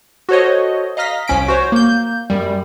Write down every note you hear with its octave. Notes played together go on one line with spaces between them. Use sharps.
F#4 A4 C5 C#5 D#5
D#5 F5 A#5 F6 A#6 B6
C2 F3 C#4 B6 D7
F#4 C5 C#5
A#3 G6
F#2 G3